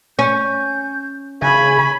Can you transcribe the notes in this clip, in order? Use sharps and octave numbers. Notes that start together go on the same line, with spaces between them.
C#4 G6
C#3 G#5 B5 C#6